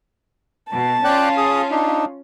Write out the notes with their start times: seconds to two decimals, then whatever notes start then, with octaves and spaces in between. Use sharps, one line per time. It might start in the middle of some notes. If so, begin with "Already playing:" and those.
0.72 B2 A5
1.04 C#4 F4 D5 G5 F#6
1.37 G#4 D#6
1.71 D4 D#4